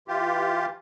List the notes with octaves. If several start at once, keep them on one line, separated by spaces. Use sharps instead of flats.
E3 F4 G4